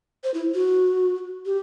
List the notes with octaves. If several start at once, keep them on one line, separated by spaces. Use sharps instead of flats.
C5
E4
F#4
G4